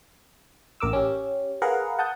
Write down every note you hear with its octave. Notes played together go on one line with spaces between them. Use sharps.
A1 A#4 D6 E6
C#4 G4
G#4 A#4 B4 F5 F#5
F#5 A5 D#6 G6